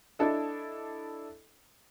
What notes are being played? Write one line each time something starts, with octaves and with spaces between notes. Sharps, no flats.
D4 E4 A4 D#5